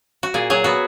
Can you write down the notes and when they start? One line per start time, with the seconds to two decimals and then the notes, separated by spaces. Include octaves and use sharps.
0.23 F#4
0.34 A#2 G#4
0.50 F#3 G#4
0.64 B3 F#4